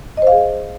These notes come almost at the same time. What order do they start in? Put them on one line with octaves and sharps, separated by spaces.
D#5 C5 F5 G#4